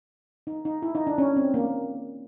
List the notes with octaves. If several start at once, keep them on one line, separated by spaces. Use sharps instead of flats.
D#4
D#4
E4
D#4
D4
C#4
C4
A#3